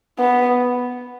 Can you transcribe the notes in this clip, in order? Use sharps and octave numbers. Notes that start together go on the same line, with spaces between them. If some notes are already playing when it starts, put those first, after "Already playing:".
B3